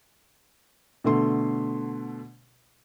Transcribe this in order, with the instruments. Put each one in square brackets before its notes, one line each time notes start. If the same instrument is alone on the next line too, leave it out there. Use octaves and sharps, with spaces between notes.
[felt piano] B2 D3 A3 C6